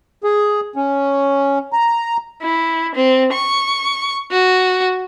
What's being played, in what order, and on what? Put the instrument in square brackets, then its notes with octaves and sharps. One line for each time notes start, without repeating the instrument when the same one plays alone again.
[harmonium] G#4
C#4
A#5
[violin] E4
C4
C#6
F#4